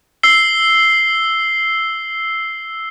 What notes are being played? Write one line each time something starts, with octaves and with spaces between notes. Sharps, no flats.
E6 C7 G7